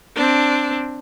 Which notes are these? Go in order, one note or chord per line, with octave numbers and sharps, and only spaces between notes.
C4 D4